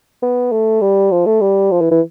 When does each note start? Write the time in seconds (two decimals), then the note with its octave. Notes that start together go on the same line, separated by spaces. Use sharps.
0.22 B3
0.52 A3
0.82 G3
1.11 F3
1.26 A3
1.41 G3
1.71 F3
1.81 E3
1.91 E3